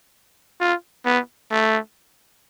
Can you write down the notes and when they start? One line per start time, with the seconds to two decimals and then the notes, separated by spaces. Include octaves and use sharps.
0.60 F4
1.05 B3
1.51 A3